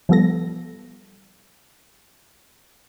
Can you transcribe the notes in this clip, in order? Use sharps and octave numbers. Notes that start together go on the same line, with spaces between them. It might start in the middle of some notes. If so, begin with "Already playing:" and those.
F3 G3 B3 A4 A#6